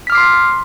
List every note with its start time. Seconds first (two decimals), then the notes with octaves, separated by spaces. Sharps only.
0.07 B6
0.10 F6
0.12 D6
0.15 C7
0.18 C6